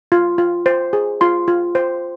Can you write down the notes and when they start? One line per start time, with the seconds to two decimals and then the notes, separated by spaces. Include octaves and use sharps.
0.12 F4
0.38 F4
0.66 C5
0.93 G#4
1.21 F4 C6
1.48 F4
1.75 C5